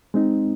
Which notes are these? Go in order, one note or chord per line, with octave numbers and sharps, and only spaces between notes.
G#3 C4 D#4